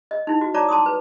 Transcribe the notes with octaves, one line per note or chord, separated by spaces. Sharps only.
D#5
D#4 E4
F#4
C#5 D5 A5 A#5 D6
A5 C6 D6 D#6
B4